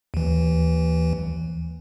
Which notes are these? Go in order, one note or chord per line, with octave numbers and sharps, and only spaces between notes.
D#2 E3